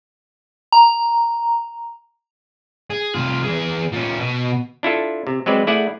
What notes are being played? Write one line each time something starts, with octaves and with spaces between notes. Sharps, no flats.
A#5
G#4
C2 F4
E3 G#4
A#2 C#4
B2
D4 E4 F4 A4
C3
F#3 G#3 C4 B4 D5
A3 E4 G#4 D5 F#5